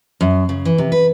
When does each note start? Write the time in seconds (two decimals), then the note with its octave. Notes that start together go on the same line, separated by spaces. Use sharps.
0.21 F#2
0.49 C#3
0.65 E3
0.78 C3
0.92 B4